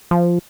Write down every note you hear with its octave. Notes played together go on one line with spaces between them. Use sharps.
F3